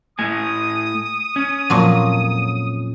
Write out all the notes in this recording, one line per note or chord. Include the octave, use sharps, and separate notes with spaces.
A2 A3 G#5 D#6
C#4
F2 A#2 F#3